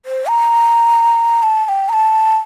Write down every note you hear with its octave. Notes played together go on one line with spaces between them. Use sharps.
C5
A#5
A5
A5
G5
A#5
A5